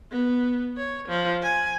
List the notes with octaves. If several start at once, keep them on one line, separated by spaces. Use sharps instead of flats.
B3
C#5
F3
G#5